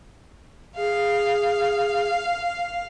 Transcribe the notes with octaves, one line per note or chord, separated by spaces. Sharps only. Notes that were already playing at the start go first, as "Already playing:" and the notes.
G#4 F5